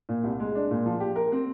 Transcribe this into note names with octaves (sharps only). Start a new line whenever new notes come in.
A#2
C2
G#3
D4
A#2
F3
G4
A#4
C4